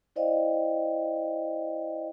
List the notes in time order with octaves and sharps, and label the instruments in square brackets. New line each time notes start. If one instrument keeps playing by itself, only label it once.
[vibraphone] E4 C5 D5 D#5 F5 G5